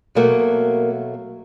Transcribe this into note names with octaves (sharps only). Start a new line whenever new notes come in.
B2 F#3 A3 A#3